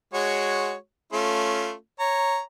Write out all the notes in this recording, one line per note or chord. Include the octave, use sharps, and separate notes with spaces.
G#3 F#4 C#5
A3 C#4 F4
C#5 A#5